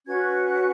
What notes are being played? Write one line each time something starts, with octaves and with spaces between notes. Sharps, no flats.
C#4 F#4 B4 G#6
F#6